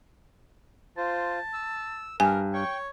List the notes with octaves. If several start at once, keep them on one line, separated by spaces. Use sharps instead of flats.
F4 C5 A5
E6
G2 A#4 G#5
C#5 G5 C#6